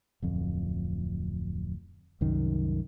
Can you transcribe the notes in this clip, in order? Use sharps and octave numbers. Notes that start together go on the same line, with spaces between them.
D1 F2
C2 F#2 D#3